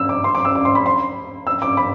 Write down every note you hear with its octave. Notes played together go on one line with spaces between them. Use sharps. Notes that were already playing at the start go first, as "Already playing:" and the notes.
Already playing: E6
D6
C6
D6
E6
D6
C6
B5
C6
E6
D6
B5